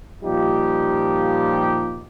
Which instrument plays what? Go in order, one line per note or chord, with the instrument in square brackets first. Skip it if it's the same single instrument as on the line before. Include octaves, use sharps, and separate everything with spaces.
[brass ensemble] A#2 F3 G3 D#4 F4 G4